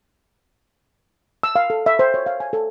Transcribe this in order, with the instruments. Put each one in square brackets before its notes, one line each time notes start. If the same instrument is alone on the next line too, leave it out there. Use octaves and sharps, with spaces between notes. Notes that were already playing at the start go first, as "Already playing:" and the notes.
[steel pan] E6
F5
A4
E5
C5
C#5
F5
G#5
A4